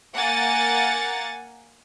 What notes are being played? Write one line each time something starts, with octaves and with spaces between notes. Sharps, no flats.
A#3 F#5 G#5 A6